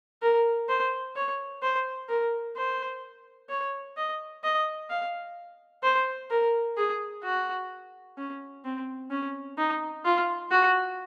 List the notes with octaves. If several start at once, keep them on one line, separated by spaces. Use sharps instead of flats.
A#4
C5
C#5
C5
A#4
C5
C#5
D#5
D#5
F5
C5
A#4
G#4
F#4
C#4
C4
C#4
D#4
F4
F#4